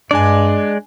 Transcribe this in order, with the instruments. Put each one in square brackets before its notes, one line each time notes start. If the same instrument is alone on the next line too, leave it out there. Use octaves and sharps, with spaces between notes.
[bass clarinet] G2 [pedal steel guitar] G#3 D5 [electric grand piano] D4 G#5